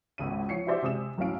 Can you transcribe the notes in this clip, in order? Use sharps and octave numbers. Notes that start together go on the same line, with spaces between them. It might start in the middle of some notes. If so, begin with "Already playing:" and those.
G#1 C#2 C#3 D#7
F3 C#5 C7 C#7
E4 F#4 G4 C5 D5 E5
C3 G#3 D#6 E7
F#1 B1 A2 C#4 F5 D7